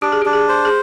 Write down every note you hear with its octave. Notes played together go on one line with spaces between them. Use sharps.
D4 G4
G#4
G4
D4
G#4
C5
G#4